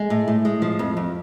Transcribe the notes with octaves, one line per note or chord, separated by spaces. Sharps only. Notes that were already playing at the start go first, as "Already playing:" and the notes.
Already playing: G#3
A2
A2
G#3
F3
F2
F2